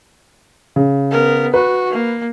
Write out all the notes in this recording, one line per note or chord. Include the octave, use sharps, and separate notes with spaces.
C#3
B3 A#4
F#4 B4
A#3